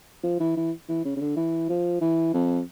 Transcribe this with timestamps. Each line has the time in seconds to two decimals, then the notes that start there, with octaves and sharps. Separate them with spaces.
0.24 F3
0.40 E3
0.57 E3
0.89 E3
1.05 C#3
1.16 C#3
1.21 D3
1.37 E3
1.69 F3
2.01 E3
2.34 F2